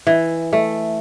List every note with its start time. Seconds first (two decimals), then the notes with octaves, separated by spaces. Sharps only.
0.07 E3
0.53 A3